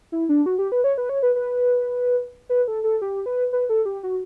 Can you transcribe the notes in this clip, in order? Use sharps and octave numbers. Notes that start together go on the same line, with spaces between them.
E4
D4
F#4
G4
B4
C#5
B4
C#5
B4
B4
B4
A4
A4
G4
B4
B4
A4
G4
F#4